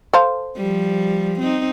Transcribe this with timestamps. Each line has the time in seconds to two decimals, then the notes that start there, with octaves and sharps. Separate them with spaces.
0.13 A4 C5 F5
0.56 F3 G3
1.40 C4 D#4